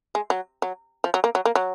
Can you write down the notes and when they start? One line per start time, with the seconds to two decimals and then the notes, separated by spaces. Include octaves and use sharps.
0.15 G#3
0.30 F#3
0.62 F#3
1.04 F3
1.14 F#3
1.24 A#3
1.35 F#3
1.45 A#3
1.55 F#3